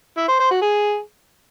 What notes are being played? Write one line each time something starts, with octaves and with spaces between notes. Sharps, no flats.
E4
C5
C5
F#4
G#4